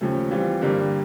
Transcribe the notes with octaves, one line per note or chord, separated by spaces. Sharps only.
D#2 C#3 F3 A3
E3 G3 C4 F4
G2 D3 G3 A#3